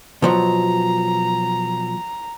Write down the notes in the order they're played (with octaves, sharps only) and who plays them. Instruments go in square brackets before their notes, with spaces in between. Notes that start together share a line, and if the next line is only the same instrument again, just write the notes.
[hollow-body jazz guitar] B2 F3 F#3 [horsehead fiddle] A#5